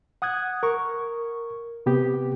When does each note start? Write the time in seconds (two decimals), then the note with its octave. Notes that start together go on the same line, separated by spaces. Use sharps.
0.22 F#5 D#6 F#6 G#6
0.63 A#4 C#6
1.86 C3 B3 G4